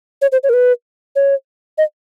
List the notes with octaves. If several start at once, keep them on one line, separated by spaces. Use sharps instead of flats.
C#5
C5
C#5
A#4
B4
C#5
D#5